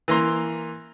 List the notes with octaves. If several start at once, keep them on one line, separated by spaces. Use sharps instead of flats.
E3 A#3 A#5 C6